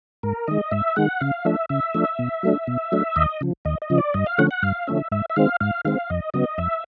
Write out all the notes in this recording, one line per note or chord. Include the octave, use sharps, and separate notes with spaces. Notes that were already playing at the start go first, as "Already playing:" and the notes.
G#2 A#4
D#3 G#3 D#5
G#2 E5
D#3 G#3 F#5
C#3 F5
F3 A3 D4 E5
C#3 E5
F3 A3 D4
B2
F#3 A3 D4
B2
F#3 A3 D4
D#2 D#5
C#3 F3
D#2 D#5
D#5
C#3 F3
D5
G2 D#5
F5
D3 F3 A3 C#4 F#5
F#5
G2 F5
D3 F3 A3 C#4 E5
G#2 E5
E5
D#3 G#3 C4 F5
G#2 F5
D#3 G#3 C4 F5
F2 D#5
C#3 F#3 B3 D#5
F2 E5